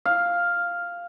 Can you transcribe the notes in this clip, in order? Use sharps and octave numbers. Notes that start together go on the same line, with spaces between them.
F5